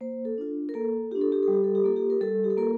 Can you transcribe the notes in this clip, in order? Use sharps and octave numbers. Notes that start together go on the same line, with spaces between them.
A#3 C5
A4
D4 F4
A#4
A#3 A4
D4 F4 G4
A4
G4
G3 A4
G4
A4
G4
A#3 F4 A4
G4
A#4
G3 A4
G4
A4
A#3 F4 A#4